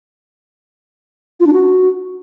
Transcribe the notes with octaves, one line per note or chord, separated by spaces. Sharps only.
F4
D4
F#4